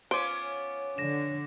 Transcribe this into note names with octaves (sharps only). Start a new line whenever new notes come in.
B3 C#4 F4 C5 D6 D7
D3 A#6 E7